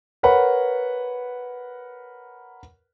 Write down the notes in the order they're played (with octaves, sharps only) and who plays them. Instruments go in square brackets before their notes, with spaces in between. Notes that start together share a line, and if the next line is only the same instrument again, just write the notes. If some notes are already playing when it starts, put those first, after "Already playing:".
[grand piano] A#4 B4 C#5 F#5 B5